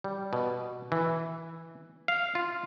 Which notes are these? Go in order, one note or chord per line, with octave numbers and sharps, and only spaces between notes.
G3
B2
E3
F5
F4